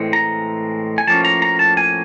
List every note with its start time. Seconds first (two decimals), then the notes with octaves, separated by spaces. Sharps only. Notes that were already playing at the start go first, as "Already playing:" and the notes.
Already playing: A2 E3 G#3 C4
0.13 A#5
0.98 G#5
1.07 A2 F3 A#3 C#4 A5
1.25 A#5
1.42 A#5
1.59 A5
1.77 G#5